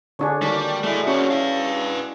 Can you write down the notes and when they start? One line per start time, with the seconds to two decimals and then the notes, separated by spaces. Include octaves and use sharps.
0.19 D3 D4 G#4 C#5
0.42 D#3 G3 A#3 D4 F#4
0.83 G#3 A3 D4 E4 B4
1.07 A#3 C#4 F#4
1.31 E4 B4 F5